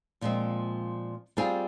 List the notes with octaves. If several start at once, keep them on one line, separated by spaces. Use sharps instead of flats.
A#2 F3 G#3 C4
G3 C4 F4 G#4